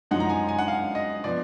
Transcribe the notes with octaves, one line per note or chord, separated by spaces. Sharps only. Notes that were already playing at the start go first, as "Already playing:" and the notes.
F#2 F3 G#3 D#4 F#5
A#5
G#5
G#5
F#5
F5
D#5
F3 B3 D5